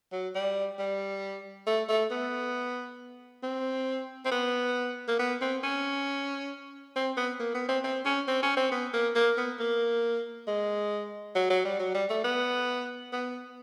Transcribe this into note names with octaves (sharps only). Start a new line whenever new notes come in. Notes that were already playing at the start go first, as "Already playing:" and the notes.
F#3
G3
G3
A3
A3
B3
C4
C4
B3
A#3
B3
C4
C#4
C4
B3
A#3
B3
C4
C4
C#4
C4
C#4
C4
B3
A#3
A#3
B3
A#3
G#3
F#3
F#3
G3
F#3
G3
A3
B3
B3